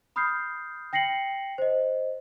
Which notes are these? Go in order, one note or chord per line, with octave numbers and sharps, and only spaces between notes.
B5 D#6 F6 G6 C7
G5 A#6 C7 C#7 F#7
C5 D#5